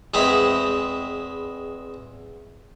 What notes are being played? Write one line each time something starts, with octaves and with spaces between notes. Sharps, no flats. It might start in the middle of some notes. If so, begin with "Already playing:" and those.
E2 G#3 C4 B5